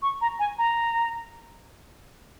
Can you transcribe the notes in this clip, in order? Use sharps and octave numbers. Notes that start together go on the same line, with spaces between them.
C#6
A#5
G#5
A#5